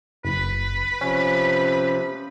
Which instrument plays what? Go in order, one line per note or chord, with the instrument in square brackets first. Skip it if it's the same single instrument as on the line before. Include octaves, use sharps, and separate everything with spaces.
[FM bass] F#1 [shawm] B4
[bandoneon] C3 F3 [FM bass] C#4